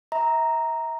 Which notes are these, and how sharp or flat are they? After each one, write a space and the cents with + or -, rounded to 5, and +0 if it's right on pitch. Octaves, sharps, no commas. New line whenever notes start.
E5 -35 A#5 +0